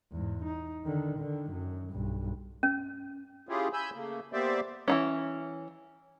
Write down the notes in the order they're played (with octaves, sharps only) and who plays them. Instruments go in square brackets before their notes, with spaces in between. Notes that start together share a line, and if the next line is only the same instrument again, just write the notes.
[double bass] E2 G#2
D#4
D3 D#3
D3 D#3
F#2
B1 G2
[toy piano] C#4
[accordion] C#4 E4 F4 G4 G#4
G#5 B5 E6 G6
C#3 A3 A#3
A#3 B3 G4 C5 D5 E5
[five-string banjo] E3 F#3 C#4